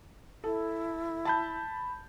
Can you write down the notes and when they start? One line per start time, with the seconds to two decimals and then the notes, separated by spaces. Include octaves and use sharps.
0.44 E4 A4
1.25 A5 B5 G6